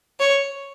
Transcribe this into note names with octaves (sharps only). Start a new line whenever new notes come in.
C#5